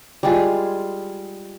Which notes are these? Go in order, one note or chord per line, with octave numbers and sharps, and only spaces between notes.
G3 G#3 F4 G#4